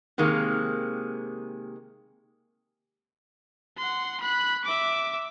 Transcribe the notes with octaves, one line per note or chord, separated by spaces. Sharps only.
C3 D#3 G#3 A#3
F#5 C6
B5 F#6
E5 D6